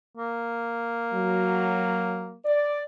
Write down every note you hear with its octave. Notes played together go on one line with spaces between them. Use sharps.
A#3
F#3
D5